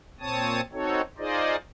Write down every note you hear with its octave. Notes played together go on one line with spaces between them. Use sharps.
A#2 C4 C#5 A5 D#6
C4 D#4 F#4 A4 C#5
D#4 F4 G#4 C5 D5 D#5